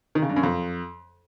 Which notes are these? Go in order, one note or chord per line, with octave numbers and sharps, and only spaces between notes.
D#3
C#3
G2
F#2
F2